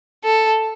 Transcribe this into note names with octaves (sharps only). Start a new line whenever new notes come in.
A4